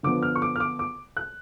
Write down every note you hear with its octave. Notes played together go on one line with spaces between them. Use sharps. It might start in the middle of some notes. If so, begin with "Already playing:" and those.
D3 F3 B3 D6
F6
C#6
D6
F6
D6
D6
F#6